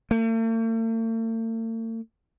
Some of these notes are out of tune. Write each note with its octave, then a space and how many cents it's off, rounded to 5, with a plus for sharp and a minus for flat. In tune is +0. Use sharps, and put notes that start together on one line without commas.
A3 +45